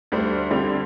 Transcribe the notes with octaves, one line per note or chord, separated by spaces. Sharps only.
D2 G3 C5
D3 G3 C4